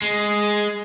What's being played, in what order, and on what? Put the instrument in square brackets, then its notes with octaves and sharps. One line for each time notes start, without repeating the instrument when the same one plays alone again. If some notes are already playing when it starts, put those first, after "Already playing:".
[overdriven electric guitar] G#3